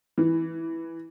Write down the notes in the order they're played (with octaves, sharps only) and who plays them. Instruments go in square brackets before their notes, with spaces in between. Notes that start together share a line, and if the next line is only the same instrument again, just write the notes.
[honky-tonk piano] E3